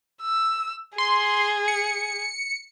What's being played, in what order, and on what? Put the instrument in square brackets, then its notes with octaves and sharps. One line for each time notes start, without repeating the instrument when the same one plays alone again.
[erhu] E6
[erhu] G#4 [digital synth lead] C6
[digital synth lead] C#7